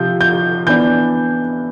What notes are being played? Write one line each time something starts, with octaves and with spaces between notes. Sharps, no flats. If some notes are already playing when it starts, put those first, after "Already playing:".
Already playing: C3 F3 C4 G6
G6
E3 B3 D4 G6